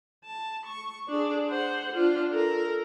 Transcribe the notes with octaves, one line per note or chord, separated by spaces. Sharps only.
A5
C#6
D4 G#4
C5 F#5
D4 F4
A4 A#4